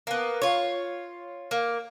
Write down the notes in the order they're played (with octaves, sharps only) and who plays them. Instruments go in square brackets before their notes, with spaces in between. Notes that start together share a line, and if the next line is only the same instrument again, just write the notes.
[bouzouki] A#3 B3
F4 C#5
A#3